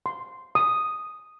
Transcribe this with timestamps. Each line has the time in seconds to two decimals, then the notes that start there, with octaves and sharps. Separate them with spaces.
0.06 C6
0.55 D#6